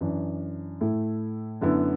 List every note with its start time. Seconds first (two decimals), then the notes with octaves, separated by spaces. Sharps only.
0.01 F#2 E3 D4
0.81 A2 A3 E4
1.61 F#2 D3 B3 E4